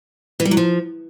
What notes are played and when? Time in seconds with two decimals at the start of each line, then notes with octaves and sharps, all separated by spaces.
0.40 E3
0.45 G3
0.51 F#3
0.57 F3